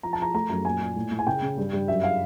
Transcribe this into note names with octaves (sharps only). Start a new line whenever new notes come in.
F3 A#5
A5
F3 A#5
A3 A#5
F#2 A#5
A#2 G#5
A#2
A2
A2
G#5
C#3 G5
C#3
G2
G2
F#2 E5
F5